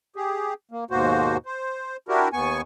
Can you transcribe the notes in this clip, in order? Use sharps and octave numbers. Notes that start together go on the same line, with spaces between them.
G4 G#4
A#3
D#2 G#2 B2 A#3 F#4 C5
C5
D4 E4 F#4 G4 A#4
D#2 B3 G#5 C#6